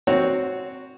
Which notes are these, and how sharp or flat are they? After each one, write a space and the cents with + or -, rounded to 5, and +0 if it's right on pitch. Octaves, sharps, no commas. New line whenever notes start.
C4 +0 F#4 +0 C#5 +0